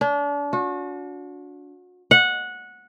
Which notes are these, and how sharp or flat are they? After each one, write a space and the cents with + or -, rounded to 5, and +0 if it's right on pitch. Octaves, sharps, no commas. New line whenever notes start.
D4 -35
F#4 -35
F#5 -15